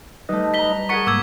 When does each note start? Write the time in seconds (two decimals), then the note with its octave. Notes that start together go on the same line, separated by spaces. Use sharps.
0.29 G3 A3 D#4 B4 D#5
0.54 A#5 A#6 B6 G7
0.89 G#4 A#4 F#5 A5 C#6 B6 C#7
1.07 G#2 A#3 D6 E6 G#6